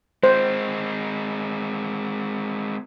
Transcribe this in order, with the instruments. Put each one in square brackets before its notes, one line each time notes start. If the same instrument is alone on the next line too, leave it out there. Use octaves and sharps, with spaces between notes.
[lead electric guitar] G#3 C4 [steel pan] C5